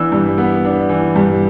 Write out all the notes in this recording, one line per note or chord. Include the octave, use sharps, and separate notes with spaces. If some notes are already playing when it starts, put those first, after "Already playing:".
Already playing: E3 B3 D4 E6
G2
B3
D4
E3
G2